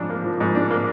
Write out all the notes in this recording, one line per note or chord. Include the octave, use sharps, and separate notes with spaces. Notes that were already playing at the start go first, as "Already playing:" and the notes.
Already playing: G#2 F3 D4
A#3
F3
G#2
D4
A#3